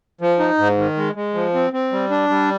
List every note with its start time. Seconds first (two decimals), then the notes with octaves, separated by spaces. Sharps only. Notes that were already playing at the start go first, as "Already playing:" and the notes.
0.21 F3
0.39 D#4
0.58 G#2
0.78 D#3
0.97 G#3
1.15 G#3
1.34 F3
1.54 C4
1.73 C4
1.92 G3
2.11 D4
2.29 G3